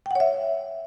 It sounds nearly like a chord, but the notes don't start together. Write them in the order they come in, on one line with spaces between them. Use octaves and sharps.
G5 F#5 C#5 E5